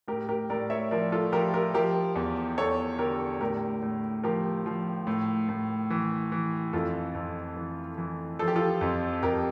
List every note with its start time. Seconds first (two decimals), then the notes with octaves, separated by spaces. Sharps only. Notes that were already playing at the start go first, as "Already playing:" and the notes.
0.08 A2 G4 A#4
0.29 G4 A#4
0.50 A2 A#4 D5
0.70 C#5 E5
0.91 F3 A#4 D5
1.12 F4 A4
1.32 F3 G4 A#4
1.54 G4 A#4
1.74 F3 G4 A#4
2.16 E2
2.58 E2 A4 C#5
2.99 D3 G4 A#4
3.41 A2 G4 A#4
3.82 A2
4.23 F3 G4 A#4
4.66 F3
5.07 A2
5.49 A2
5.90 E3
6.32 E3
6.73 F2 F4 A4
7.15 F2
7.56 E3
7.98 E3
8.39 F3 A4
8.48 G4
8.56 F4 A4
8.81 F2
9.23 F2 G4 A#4